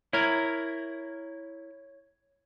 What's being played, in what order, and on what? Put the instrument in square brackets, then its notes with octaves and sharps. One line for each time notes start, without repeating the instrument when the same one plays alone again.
[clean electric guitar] E4 A#4 [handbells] C#5 G#6